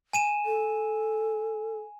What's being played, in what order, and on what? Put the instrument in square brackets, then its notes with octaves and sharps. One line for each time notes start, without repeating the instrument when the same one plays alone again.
[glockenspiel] G#5 D#7 E7
[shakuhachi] A4